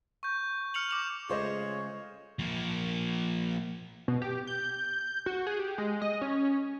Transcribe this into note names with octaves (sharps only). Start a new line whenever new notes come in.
C#6 G6
F6 C#7 F7 F#7
D6 F7 F#7
C#3 G#3 A3 F4 G#4 C5 C#5 D#5
F3 A#3
B2
G4
G6
F#4
G#4
G4
G#3
D#5
C#4